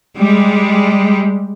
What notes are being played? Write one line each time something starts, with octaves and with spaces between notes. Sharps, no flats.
G3 G#3